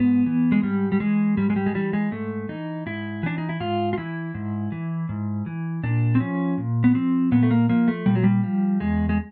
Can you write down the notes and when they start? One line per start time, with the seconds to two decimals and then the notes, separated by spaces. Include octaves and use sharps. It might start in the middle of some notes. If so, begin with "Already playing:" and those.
Already playing: G#2 B3
0.26 E3
0.52 G#3
0.63 G#2 G3
0.92 G3
1.00 E3 G#3
1.37 G#2 G3
1.50 G#3
1.56 G3
1.66 G#3
1.75 E3 G3
1.93 G#3
2.11 G#2 A3
2.49 E3 D#4
2.86 G#2 E4
3.23 E3 D4
3.38 D#4
3.49 E4
3.60 G#2 F4
3.93 F4
3.98 E3 E4
4.34 G#2
4.72 E3
5.09 G#2
5.46 E3
5.83 A#2 D4
6.15 C4
6.20 F3 C#4
6.58 A#2
6.84 B3
6.95 F3 C4
7.32 A#2 B3
7.43 A3
7.51 A#3
7.69 F3 A#3
7.88 A3
8.06 A#2 G3
8.15 F#3
8.24 G3
8.43 F3
8.80 E2 G#3
9.09 G#3